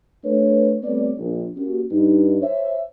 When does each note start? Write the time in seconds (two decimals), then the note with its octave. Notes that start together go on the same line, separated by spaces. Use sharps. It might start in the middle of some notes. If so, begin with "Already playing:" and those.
0.24 A3 D4 B4 C#5
0.83 G3 A3 B3 C4 C#5 D5
1.18 A#1
1.57 A#3 C#4 F#4 G4
1.91 G2 D#4
2.42 C5 C#5 E5